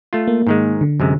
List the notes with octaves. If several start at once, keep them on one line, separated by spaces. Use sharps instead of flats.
A3 F4
A#3
G#2 D#3 G#3
D3
F#2 C3 G#3